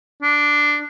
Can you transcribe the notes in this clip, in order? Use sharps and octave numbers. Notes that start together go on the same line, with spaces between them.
D4